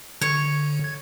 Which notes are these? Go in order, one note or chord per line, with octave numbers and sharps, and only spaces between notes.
D3 C#5
G#6